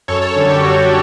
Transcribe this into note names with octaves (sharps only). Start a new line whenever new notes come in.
F#2 A4 C#5
A4 C#5
D3 G3 A4
G4
F#2 F#4
A4